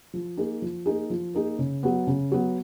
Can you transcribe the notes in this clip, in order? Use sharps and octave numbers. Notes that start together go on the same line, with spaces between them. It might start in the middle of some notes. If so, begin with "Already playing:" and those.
F3
A#3 D#4 G#4
F3
A#3 D#4 G#4
F3
A#3 D#4 G#4
C#3
F#3 B3
C#3
F#3 B3